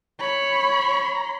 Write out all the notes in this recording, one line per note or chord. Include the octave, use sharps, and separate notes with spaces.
C#5 B5